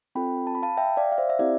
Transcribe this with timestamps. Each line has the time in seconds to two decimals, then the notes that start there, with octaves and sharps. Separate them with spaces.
0.15 C4 F4 A4 G5 B5
0.47 A5
0.55 B5
0.63 F5 A5
0.77 E5 G5
0.97 D5 F5
1.12 F5
1.18 C5 E5
1.29 E5
1.39 C4 E4 G4 D5